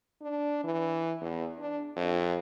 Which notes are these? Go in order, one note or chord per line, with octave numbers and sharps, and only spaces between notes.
D4
E3
E2
D4
F2